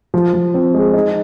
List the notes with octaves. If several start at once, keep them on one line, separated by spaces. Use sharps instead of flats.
F3
F3
C4
G#3
D#4